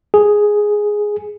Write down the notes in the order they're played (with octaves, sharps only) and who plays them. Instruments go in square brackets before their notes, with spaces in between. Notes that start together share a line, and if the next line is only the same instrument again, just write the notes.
[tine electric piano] G#4